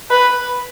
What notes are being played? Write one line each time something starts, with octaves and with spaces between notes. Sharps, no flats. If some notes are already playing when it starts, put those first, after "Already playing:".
B4